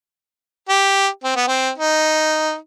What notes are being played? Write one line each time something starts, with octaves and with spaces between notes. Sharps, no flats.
G4
C4
B3
C4
D#4